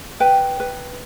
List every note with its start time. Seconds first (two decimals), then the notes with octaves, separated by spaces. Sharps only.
0.20 B4 G5
0.60 B4